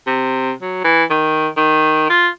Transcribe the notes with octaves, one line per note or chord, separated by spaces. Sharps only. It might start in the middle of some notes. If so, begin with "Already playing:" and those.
C3
F#3
E3
D#3
D#3
F4